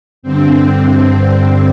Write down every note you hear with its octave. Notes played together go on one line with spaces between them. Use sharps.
G2 D3 C4